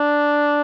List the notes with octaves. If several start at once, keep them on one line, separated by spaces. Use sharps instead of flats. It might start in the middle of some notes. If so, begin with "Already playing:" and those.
Already playing: D4